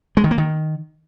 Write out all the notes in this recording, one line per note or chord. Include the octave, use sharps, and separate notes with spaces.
G#3
D#3
A#3
D#3